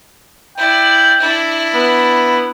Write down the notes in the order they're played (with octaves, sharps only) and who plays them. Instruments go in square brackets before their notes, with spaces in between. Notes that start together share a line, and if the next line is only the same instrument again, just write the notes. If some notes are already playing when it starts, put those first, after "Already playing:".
[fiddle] E4 D5 [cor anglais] G5
[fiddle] D4 E4
[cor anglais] B3